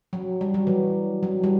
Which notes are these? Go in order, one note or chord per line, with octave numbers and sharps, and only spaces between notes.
F#3
G3
F#3
E3
F#3
G3